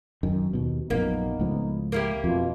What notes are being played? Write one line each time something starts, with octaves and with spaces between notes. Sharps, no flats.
F#2 D#3
D#2 B2
A#1 F#2 A#2 A#3 B3 D#4
C#2 A2 F3
A#3 E4 G4
F2 B2 F4